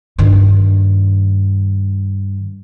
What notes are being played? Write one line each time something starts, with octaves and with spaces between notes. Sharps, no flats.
G2 D#3